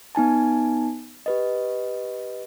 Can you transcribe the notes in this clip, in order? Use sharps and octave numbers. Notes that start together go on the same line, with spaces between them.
B3 D#4 G#5 A5
G4 B4 D#5